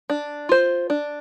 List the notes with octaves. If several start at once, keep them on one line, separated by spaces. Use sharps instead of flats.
D4
F4 C5
D4